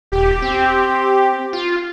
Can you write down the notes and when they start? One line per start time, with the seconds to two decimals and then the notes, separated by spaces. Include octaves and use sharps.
0.12 D#1 G4
0.42 C4
1.53 F4